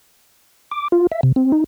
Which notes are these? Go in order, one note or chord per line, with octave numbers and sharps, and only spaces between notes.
D6
F4
E5
C3
C4
D#4